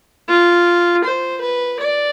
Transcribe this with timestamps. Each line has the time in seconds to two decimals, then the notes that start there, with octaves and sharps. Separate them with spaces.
0.28 F4
1.04 C5
1.41 B4
1.79 D5